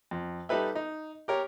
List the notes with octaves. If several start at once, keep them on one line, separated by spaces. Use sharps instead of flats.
F2
G3 D#4 A4 B4 E5
D#4
G4 A#4 C#5